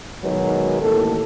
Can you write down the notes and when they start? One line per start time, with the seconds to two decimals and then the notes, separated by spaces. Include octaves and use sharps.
0.24 B2 D#3 F#3 G#3 B3 A#4
0.81 A1 A2 D#3 A#3 A4